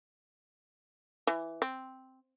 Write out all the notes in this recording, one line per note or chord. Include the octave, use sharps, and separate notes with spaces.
E3
C4